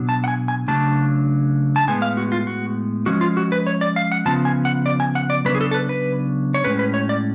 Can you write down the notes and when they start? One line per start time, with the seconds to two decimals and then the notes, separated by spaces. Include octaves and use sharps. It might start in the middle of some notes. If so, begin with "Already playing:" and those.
Already playing: B2 F#3 B3 D4
0.09 A5
0.24 F#5
0.28 G#5
0.48 G#5
0.68 C#3 F#3 A3 D4 A5
1.76 A5
1.87 A2 G#3 B3 G#5
2.02 F5
2.17 F#4
2.32 F4
2.47 F#4
3.06 F3 G#3 C#4 F#4
3.21 F4
3.37 F#4
3.52 B4
3.67 C#5
3.81 D5
3.96 F5
4.12 F#5
4.26 C#3 F3 B3 A5
4.45 G#5
4.65 F#5
4.86 D5
5.00 G#5
5.15 F#5
5.30 D5
5.45 C#3 F#3 B3 D4 B4
5.55 G#4
5.61 A4
5.71 A4
5.74 B4
5.89 B4
6.54 C#5
6.64 A2 G#3 C#4 B4
6.79 B4
6.94 C#5
7.09 D5